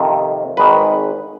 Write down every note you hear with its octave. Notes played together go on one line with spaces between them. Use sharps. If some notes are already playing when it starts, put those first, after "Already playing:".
Already playing: F2 C3 D#3
G#1 G#2 D#3 B4